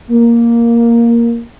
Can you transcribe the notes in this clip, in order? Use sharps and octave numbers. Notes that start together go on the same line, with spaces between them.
A#3